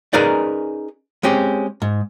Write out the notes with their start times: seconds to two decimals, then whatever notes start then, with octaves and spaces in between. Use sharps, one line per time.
0.13 C#4 D#4 G#4 A#4 B4 D5
1.23 G#3 C4 C#4 G4
1.82 G#2